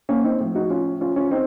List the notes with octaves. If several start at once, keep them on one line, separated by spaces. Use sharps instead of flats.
A#3 C#4
C4 D#4
A2 F3
D#4 F#4
C#4 F4
C#4 F4
C#4 F4
C4 D#4